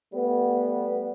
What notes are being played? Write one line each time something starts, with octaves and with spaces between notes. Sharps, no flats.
G3 A3 B3